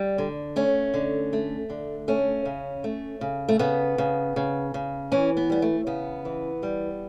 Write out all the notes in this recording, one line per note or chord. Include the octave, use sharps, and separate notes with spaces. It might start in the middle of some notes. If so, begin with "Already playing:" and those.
Already playing: G3
D3
A3 C#4
D3
A3
D3
A3 C#4
C#3
A3
C#3
A3
C#3 B3
C#3
C#3
C#3
E3 C#4
B3
G3 B3
A3
C#3 B3
E3
G3